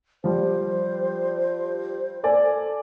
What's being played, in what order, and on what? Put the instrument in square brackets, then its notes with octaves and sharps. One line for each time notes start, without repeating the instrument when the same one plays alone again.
[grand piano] F3 G3 [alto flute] C5
[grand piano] A4 D5 G#5